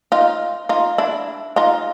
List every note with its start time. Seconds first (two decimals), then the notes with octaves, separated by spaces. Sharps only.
0.12 D#4 F4
0.69 D#4 F4
0.98 D4 E4
1.56 D#4 F4